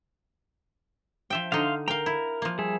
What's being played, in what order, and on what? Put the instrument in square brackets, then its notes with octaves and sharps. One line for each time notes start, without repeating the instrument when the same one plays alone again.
[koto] F3 E5 G5
[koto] D3 D#4 [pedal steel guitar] F5 C6
[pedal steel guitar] A#4 A#5 [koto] F5 G5
[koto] E4
F3 A#3
[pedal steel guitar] G3 G#4 E5